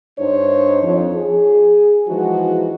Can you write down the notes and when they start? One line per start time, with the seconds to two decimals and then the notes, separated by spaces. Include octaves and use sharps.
0.19 G2 D4 D#4 C5 C#5
0.83 F2
1.15 G#4
2.08 E3 F3 G#3 D#4 F#4